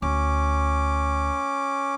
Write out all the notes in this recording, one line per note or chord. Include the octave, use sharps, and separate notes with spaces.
D2 C#4 D6